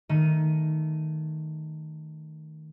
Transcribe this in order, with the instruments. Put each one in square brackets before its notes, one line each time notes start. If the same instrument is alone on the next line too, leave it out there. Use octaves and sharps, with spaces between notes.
[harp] D#3 A3 D#7